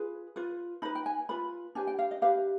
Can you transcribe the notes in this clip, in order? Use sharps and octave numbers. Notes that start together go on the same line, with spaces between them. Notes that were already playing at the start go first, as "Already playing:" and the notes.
Already playing: F4 G#4 B4
F4 B4
D#4 B4 B5
G5
G#5
F4 B4 B5
D4 G4 B4 G#5
G5
F5
D#5
D4 G4 B4 F5